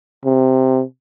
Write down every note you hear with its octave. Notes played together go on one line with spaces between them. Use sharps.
C3